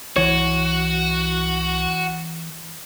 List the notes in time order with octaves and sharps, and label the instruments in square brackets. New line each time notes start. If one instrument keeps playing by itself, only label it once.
[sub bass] C2 [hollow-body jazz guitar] E3 C#5 [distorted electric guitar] F#4